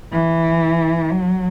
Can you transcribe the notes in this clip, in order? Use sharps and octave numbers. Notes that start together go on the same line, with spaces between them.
E3
F#3